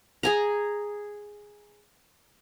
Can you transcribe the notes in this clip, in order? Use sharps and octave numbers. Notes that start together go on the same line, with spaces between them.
G#4 G#5 A#5